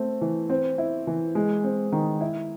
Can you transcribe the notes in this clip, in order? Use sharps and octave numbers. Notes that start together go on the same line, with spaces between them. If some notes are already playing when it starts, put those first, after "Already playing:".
Already playing: A3 C4
E3
C4
E4
E3
G#3
C4
D#3
E4